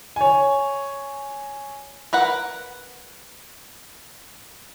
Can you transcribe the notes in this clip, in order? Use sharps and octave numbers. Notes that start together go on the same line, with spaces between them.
C#5 G#5
A#4 B4 F#5